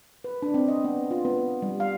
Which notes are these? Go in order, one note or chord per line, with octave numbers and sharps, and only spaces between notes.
B4
D4
C4
D#5
B3
F4
B3
G3
F5